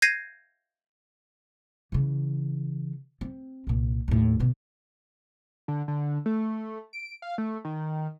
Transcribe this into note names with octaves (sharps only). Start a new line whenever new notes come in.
G6 G#6 A#6 C7 D#7
C#3 E3
C4
C2 A#2
D#2 A2
B2 D3
D3
D3
A3
D7
F5
A3
D#3